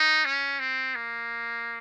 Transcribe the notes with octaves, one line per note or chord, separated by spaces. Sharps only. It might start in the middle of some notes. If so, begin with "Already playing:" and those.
Already playing: D#4
C#4
C4
A#3